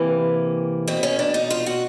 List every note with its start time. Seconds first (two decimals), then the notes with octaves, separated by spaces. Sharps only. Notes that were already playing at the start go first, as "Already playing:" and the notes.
Already playing: C3 E3 A#3
0.87 B2 C4
1.03 C#4
1.19 D4
1.34 D#4
1.50 F4
1.66 F#4